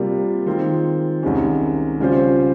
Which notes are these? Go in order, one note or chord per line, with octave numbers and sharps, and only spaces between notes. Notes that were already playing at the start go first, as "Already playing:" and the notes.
Already playing: C3 G3 A#3 F4
D#3 G#3 C4 F4
C2 C3 D#3 G#3 C#4
C#3 G3 C#4 F4 C5